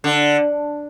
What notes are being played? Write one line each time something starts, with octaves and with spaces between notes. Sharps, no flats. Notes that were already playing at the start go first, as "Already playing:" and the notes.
D3